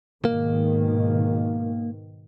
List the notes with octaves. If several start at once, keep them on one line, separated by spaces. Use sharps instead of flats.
G#2 B2 D#3 A#3